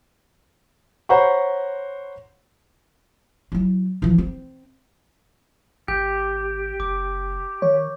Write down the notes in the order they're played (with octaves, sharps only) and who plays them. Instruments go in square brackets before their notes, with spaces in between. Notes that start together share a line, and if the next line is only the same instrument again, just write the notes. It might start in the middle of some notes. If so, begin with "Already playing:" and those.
[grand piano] C5 C#5 F#5 A#5 B5 C#6
[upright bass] F#3 E4
E3 F3
C4
[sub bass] G#1 [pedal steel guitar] G4 [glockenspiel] G6
[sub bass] F#1 [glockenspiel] D6
[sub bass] D#3 [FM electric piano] C#5